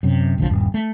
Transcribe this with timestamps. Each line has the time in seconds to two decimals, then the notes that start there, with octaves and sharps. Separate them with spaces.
0.03 F#2 C3
0.38 F1 A#1 D3 F3
0.50 D#1 G2
0.74 A3